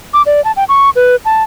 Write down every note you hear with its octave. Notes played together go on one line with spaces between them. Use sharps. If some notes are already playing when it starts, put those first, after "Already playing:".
D6
D5
A5
G5
C#6
B4
A5